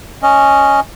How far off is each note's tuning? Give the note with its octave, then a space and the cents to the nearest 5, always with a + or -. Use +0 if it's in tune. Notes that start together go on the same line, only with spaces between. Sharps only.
C#4 +0 D#5 +0